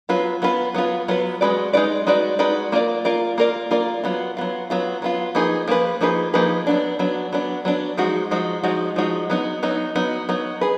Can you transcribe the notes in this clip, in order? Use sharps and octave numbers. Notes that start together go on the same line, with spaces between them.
F#3 B3 F4 B4
F#3 B3 F4 B4
F#3 B3 F4 B4
F#3 B3 F4 B4
G#3 D#4 F#4 B4 D5
G#3 D#4 F#4 B4 D5
G#3 D#4 F#4 B4 D5
G#3 D#4 F#4 B4 D5
A#3 F4 A#4 D5
A#3 F4 A#4 D5
A#3 F4 A#4 D5
A#3 F4 A#4 D5
F#3 B3 F4
F#3 B3 F4
F#3 B3 F4
F#3 B3 F4
F3 A#3 D#4 G#4 B4
F3 A#3 D#4 G#4 B4
F3 A#3 D#4 G#4 B4
F3 A#3 D#4 G#4 B4
F#3 B3 D4
F#3 B3 D4
F#3 B3 D4
F#3 B3 D4
F3 G#3 D#4 F#4
F3 G#3 D#4 F#4
F3 G#3 D#4 F#4
F3 G#3 D#4 F#4
F#3 B3 D#4
F#3 B3 D#4
F#3 B3 D#4
F#3 B3 D#4
G#4 B4